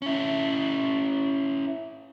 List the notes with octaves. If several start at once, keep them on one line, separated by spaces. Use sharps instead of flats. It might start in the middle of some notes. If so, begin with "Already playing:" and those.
C#4 E4